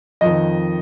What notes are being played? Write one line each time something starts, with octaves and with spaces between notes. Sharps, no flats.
F2 D#3 D#5